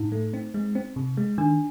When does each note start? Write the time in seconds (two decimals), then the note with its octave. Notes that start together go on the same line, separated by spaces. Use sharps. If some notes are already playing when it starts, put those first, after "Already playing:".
Already playing: A2 D#4
0.12 A3
0.34 C4
0.54 G#3
0.75 C4
0.96 C3
1.17 G#3
1.38 D#3 D4